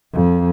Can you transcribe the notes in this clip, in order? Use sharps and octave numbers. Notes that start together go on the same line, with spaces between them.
F2